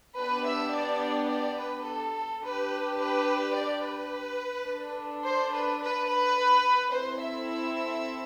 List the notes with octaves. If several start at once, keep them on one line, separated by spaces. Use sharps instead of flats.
B3 D4 G4 B4
E5
D5
D5
B4
A4
D4 G4 B4
B4
D5
B4
D4 A4
C5
B4
B4
B4
C4 E4 A4 C5
E5